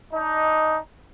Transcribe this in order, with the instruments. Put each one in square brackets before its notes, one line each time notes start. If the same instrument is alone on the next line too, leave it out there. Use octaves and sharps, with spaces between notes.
[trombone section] D4 D#4